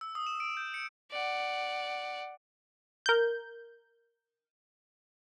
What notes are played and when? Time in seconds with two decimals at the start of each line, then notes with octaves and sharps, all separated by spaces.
0.01 E6
0.15 D#6
0.27 E7
0.40 D7
0.57 G6
0.74 C#7
1.11 D5 F#5
3.06 A#4 G6